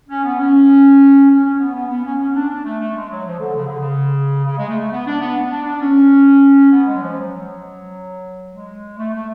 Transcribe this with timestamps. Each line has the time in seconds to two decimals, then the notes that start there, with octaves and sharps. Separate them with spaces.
0.09 C#4
0.24 B3
0.39 C#4
1.30 C#4
1.45 C#4
1.59 B3
1.74 B3
1.90 B3
2.04 C#4
2.20 C#4
2.35 D4
2.49 D4
2.65 A3
2.80 A3
2.95 G#3
3.10 F#3
3.26 F3
3.40 D3
3.56 C#3
3.67 D3
3.79 C#3
4.45 C#3
4.58 G#3
4.68 A3
4.79 A3
4.91 B3
5.06 D4
5.21 B3
5.51 D4
5.66 D4
5.81 C#4
6.72 B3
6.86 G#3
6.95 F#3
7.02 F3
7.17 F#3
8.53 G#3
8.98 A3
9.13 A3